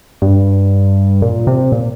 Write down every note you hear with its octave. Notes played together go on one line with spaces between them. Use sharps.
G2
A#2
C3
A#2